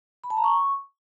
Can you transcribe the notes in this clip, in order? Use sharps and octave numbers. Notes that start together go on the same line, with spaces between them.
B5
A5
A#5
C#6